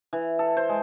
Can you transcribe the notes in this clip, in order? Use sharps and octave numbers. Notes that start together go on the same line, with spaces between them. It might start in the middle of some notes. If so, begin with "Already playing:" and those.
E3
A4
C5
G#3